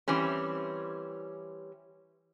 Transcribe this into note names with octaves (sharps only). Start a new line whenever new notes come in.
E3 G3 C4 C#4